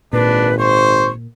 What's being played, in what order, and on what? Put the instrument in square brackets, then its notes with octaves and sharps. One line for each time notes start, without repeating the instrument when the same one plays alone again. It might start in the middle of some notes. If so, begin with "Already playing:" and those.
[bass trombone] G#1 [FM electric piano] A#2 [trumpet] D4 [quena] B4
[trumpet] C5 [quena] C#6